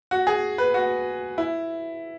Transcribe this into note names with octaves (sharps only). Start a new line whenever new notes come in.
F#4
G#4
B4
F#4
E4